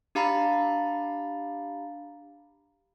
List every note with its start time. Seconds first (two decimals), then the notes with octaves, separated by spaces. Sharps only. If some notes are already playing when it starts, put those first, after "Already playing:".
0.15 D4 G4 F5 A#5 B5 A6